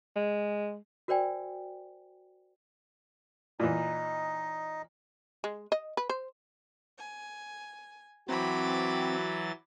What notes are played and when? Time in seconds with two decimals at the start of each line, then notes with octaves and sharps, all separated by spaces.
0.16 G#3
1.08 F#4 A#4 C5 D5 G5 G#5
3.60 A#2 E3 D#4 D#5
5.44 G#3
5.72 D#5
5.97 B4
6.09 C5
6.98 G#5
8.29 E3 F#3 C4 F#4 B5 D6 A6